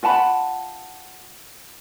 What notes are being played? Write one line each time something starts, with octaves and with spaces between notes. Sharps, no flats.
F4 F#5 A5 B5